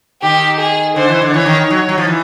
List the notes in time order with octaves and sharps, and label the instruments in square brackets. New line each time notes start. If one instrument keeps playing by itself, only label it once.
[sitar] D#3 [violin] G4
[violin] G#4
[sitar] D3 [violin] C5
[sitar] E3
D3
[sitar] E3 [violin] C#5
[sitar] D#3
F#3
F#3
F3
E3